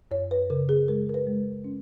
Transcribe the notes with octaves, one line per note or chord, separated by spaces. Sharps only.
F#2 C#5
B4
C#3 A#4
G#4
G#3 A#4
A#4
B4
G#3
C#4